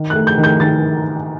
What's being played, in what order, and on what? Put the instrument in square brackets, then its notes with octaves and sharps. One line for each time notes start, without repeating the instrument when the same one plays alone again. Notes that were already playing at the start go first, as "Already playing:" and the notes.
Already playing: [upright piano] D#3
F#6
A3
G6
D#3
G6
D#3 A6